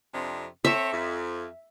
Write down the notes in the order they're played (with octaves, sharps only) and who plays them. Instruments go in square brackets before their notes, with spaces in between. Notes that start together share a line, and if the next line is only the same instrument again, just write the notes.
[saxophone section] F2 C3 D4
[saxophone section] C4 A4 C#5 [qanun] E5
[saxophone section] F2